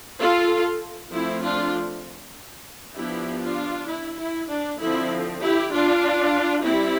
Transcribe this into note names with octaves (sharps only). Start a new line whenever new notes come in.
F4 A4
F3 A3 C4 E4
D4 F4
F3 B3 D4 E4 G4
D4 F4
E4
E4
D4
D3 F3 C4 E4
E4 G4
D4 F4
G3 C4 E4